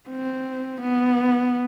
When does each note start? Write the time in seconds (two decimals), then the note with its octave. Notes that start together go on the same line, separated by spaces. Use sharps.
0.09 C4
0.81 B3